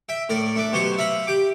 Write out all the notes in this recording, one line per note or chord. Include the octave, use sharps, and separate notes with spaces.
E5 G5
A2 A#4 D5
A3 D4 D6
B2 F#3 G4 C5 C#6
E5 F5 A#5 B5
G4 G5 D6